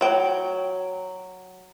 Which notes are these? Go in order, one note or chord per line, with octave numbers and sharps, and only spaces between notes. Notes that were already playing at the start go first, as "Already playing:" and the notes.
F#3 G5